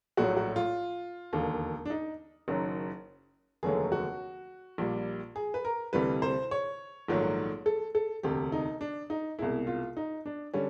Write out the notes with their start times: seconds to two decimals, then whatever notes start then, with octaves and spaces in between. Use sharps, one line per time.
0.17 A#1 A2 F#3 A3 F#4
0.37 F#4
0.56 F4
1.33 E1 D#2 D3
1.86 D4
1.90 D#4
2.48 F#1 F#2 D#3 F#3
3.63 F1 D#2 D3 F#3 A3 G#4
3.92 F#4
4.78 A#1 A#2 G3
5.36 G#4
5.54 B4
5.65 A#4
5.93 D2 C3 E3 G3 B4
6.22 C5
6.51 C#5
7.08 A#1 G#2 D#3 F#3 A3
7.66 A4
7.95 A4
8.23 E1 D2 C3 G4
8.52 D#4
8.81 D4
9.10 D#4
9.39 C2 B2 G#3 E4
9.67 F4
9.97 D#4
10.26 D4
10.54 D3 G3 C#4